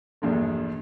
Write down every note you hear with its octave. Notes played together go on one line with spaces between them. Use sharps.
A#1 E2 G2 B2 A3